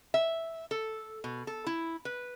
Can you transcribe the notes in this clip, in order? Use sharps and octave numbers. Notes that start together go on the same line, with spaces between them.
E5
A4
B2
A4
E4
B4